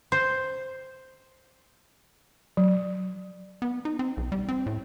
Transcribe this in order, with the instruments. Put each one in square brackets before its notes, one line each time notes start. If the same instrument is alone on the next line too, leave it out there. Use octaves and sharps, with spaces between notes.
[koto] C5
[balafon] F#3
[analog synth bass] B3
D#4
C4
B1
G3
C4
A2